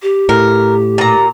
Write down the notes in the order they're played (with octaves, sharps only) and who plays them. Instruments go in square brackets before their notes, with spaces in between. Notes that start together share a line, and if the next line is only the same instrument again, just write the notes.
[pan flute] G4
[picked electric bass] A2 [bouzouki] A#4
[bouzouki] A#2 A#5